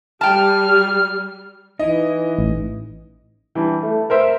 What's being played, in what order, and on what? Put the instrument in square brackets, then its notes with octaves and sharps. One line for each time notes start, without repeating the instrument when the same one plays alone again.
[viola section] G3 [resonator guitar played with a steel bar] G5 A5 [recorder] F6
[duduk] E3 [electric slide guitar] D#4 E4 [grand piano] D#5
[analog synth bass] A1
[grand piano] E3 G3 D4
A3
A#4 C5 E5